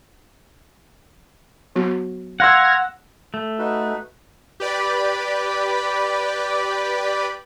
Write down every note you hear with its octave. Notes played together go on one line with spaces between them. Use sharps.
F#3 B3 F#4
F5 F#5 C6 E6 F6 G#6 A#6
A3
D#4 F#4 B4
G4 B4 D5 B5